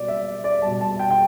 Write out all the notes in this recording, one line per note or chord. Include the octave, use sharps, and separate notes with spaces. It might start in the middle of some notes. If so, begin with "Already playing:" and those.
Already playing: B2 G3 D5
E5
D5
B2 G3 A5
A5
G5
G5